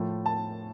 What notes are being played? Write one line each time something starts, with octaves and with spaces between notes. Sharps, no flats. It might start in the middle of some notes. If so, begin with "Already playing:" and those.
Already playing: A2 F3 A3
A5